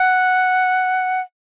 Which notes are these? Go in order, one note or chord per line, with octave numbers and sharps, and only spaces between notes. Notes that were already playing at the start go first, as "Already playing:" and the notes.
Already playing: F#5